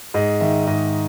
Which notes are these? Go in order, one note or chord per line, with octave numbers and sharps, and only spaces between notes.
G#2 D#5
D#3 E5
G#2 D#5